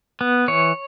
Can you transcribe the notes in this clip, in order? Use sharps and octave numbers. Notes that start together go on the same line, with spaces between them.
B3
E3 C#5